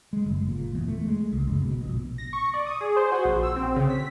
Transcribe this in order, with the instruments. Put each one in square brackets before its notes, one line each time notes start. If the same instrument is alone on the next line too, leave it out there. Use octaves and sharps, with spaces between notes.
[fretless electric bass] G#3
F#1
A#2
E2
A3
G#3
C#2
F#1
B2
A#1
[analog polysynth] A#6
C#6
D5
D#6
G#4
C5
F#4
A#1
E6
C4
C#3
B6